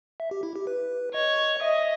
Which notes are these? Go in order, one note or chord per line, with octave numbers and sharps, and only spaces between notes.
E5
G4
E4
G4
B4
C#5 D#5
D#5 E5